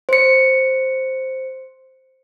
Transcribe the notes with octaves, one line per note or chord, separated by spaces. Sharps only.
C5 C#7